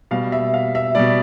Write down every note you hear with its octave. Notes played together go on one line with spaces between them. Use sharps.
B2 G3 F5
E5
F5
E5
B2 G3 D5